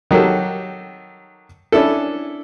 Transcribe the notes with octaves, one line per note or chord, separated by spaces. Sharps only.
D#3 F#3 G4 A4
C#4 D4 E4 A4